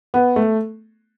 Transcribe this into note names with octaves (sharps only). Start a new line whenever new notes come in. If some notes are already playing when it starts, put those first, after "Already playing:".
B3
A3